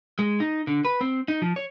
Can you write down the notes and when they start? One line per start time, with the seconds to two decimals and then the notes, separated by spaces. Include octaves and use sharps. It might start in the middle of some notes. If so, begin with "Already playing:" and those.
0.19 G#3
0.40 D#4
0.67 D3
0.85 B4
1.01 C4
1.28 D#4
1.42 F3
1.56 C#5